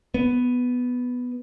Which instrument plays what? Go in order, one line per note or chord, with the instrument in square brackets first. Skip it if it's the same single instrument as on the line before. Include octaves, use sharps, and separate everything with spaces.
[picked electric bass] B3